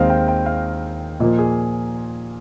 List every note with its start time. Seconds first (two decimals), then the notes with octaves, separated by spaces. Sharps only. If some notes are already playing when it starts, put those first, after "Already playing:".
Already playing: D#2 D#3 G#3 C4 D#5 F5
0.10 G5
0.28 G5
0.46 F5
1.20 A#2 F3 A#3 D#5
1.39 G#4